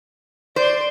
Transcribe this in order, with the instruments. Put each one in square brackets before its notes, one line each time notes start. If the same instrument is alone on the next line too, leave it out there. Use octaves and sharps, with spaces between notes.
[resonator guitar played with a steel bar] C5 [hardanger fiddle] D5 C6